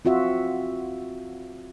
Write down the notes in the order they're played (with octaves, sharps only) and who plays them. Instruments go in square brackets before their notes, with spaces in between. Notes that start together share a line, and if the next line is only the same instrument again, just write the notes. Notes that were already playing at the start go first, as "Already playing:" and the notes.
[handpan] C4 F4 F#4 E5